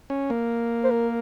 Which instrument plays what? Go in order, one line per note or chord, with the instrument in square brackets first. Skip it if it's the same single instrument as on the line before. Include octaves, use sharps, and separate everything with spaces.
[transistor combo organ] C#4
A#3
[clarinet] C5
A#4